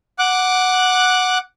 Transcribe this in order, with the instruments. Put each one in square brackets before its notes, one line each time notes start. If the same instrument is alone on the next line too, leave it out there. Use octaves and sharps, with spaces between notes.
[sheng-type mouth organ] F#5 D6 F#6